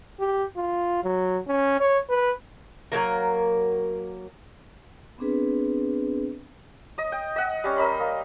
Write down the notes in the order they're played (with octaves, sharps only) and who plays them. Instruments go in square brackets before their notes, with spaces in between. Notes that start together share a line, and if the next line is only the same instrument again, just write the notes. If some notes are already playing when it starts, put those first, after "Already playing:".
[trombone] G4
F4
F#3
C#4
C#5
B4
[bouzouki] F#3 G#3 A#3 A#4
[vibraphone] B3 C4 D4 G#4 B4
[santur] D#5 D#6
G5
D#5 F#5
G3 C#4
A#4 D#5 B5 C6
A#3